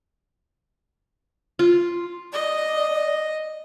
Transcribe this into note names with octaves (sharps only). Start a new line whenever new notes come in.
F4
D5 D#5